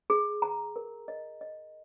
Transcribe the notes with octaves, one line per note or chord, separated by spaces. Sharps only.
G#4
A#5
A#4
D#5
D#5